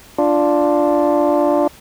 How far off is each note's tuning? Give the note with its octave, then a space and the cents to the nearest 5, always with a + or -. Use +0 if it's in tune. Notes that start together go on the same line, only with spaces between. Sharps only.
D4 +0 F4 +0